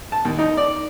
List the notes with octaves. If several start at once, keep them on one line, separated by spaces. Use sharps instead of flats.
A5
D#2
D#4
D5